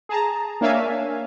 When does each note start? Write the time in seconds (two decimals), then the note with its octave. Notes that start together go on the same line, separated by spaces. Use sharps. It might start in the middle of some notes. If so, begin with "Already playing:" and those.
0.09 G#4 A5 A#5
0.61 A#3 D4 C#5 E5 F5 G#5